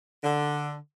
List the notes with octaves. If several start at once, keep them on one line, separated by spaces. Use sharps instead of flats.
D3